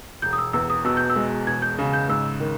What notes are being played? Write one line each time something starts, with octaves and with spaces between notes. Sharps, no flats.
E1 G6
D#6
E6
E2 E6
D#6
B2 E6
G6
E6
G#3
E1 G#6
G6
C#3
G6
G#2 E6
D#3